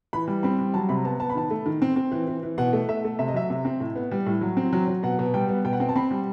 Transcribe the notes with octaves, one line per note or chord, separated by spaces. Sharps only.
E3 B5
G3
C4 B5
G3
F#3 A5
C3 B5
B3 A5
B3 A5
B5
D#3 A5
A3
D#3
C4
C4
E3
E3
E3
B2 F#5
A3
A3 E5
A3
C3 E5
D#5
F#3 E5
C3
C4
A2
B3
G3
A2
F#3
C4
F#3
F#3
B2 F#5
B2
G3 G5
B3
B2 G5
F#5
C4 G5
A5
C4 B5
G3